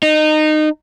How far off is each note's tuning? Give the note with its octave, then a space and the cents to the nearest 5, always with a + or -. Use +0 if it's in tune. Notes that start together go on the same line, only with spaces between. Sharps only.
D#4 -20